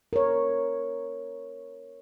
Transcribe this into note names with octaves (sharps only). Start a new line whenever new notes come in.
A#4 C#5